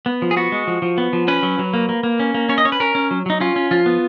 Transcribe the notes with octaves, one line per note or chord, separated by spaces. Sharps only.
B3
F3
G#4
B3 F#4
G#3
F3
F3
B3
F3
C#4 B4
F#3
F#3
A#3
A#3
A#3
C#4
A#3
C#4 C#5
D#5
C#4 C#5
B4
C#4 A#4
C#4
F#3
F#3 D#4
C#4 F4
C#4
F3 F4
B3